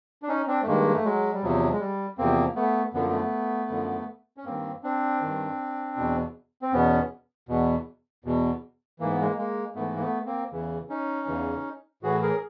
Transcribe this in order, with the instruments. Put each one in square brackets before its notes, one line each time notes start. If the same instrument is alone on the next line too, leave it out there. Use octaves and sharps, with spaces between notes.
[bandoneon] D4
C#4 D#4
C4 D4
A3
G2 D#3 G#3 A#3
A3
F#3 G#3
G3
E2 C3 F3 F#3
G#3
G3
E2 C3 F3 A#3 C4
A3 B3
F#2 D3 F3 B3
A#3
A3 B3
F#2 D3 F3
C#4
G2 D#3 A#3 C4
C4 D4
G2 D#3
E2 B2
C4
E2 B2 B3 C#4
E2 B2
E2 B2
G#2 E3 A#3
B3
G#3 A#3
G#3 A#3
G#2 E3 A3 B3
A#3
A3 B3
A#3 C4
E2 C#3 E3
C#4 D#4
E2 C#3 E3
A2 E3 F#4 G#4
G#4 A#4